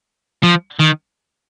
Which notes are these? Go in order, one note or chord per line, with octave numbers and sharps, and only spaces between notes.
F3
D#3